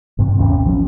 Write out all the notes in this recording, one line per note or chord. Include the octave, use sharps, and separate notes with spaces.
A1 G2 C3
A1 D#2 C#4
F3 C4 C#4